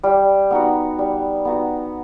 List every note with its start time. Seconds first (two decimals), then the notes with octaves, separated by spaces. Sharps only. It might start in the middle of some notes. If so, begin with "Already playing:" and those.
0.03 G3
0.51 B3 D#4 F#4
0.99 G3
1.45 B3 D#4 F#4